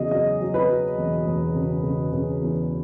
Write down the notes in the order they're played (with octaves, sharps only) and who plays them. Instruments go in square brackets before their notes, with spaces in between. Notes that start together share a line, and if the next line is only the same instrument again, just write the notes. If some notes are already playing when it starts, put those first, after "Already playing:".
Already playing: [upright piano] E2 C#3 F#3 G#4 D#5
F#3 D#5
F#3
B4
F#3
E1
E1
C#3
C#3
C#3
E2